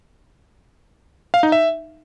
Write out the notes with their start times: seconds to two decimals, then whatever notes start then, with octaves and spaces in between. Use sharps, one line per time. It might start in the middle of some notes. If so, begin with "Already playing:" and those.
1.34 F5
1.43 D#4
1.52 E5